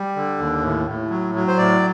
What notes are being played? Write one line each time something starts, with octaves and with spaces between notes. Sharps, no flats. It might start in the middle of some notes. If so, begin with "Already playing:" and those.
Already playing: G3
D3
D#2
A2
A2
F#3
F#3
C5
A2 D5